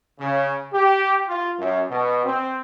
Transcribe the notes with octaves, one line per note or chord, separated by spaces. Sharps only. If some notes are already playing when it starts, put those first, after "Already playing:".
C#3
G4
F4
F#2
B2
C4